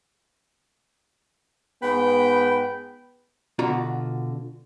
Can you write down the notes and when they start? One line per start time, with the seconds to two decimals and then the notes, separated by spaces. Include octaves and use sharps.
1.83 G#2 B3 B4 G5
3.59 B2 D3 F4 F#4 A#5